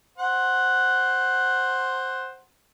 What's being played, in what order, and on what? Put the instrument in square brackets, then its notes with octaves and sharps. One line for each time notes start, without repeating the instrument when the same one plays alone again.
[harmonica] C5 F#5